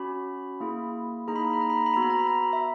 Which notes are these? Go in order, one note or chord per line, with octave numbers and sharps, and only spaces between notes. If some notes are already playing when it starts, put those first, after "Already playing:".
Already playing: C#4 F#4 B5
A#3 E4 G#4
A#3 D#4 G#4 A#5
B5
A#5
B5
A#5
B5
A#5
B5
B3 F#4 A#5
B5
A#5
B5
A#5
E5